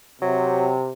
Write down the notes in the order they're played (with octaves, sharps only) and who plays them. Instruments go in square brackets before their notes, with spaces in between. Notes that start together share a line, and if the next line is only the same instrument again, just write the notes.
[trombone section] C3 [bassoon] F#3